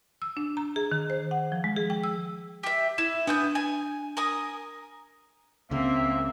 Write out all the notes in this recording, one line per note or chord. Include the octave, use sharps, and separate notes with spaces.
E6
D4
A#5
G#4
D#3
C5
F#5
F3
G#3
G#4
G5
E6
G4 E5
E4 E7
B3 D4 G#5 G6
G#5
A#4 G#5 D#6
C#2 C#3 A#3 C4 E5